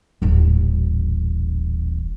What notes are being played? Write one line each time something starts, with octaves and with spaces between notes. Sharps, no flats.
D#1 A1